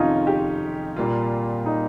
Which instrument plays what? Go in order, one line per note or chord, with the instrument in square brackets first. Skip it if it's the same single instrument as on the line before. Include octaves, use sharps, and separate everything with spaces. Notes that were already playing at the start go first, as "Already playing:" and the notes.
Already playing: [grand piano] F2 C3 D#3 [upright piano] C#4 D#4 F4
[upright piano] G4
[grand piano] A#2 G3 A#3 F4
[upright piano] D#4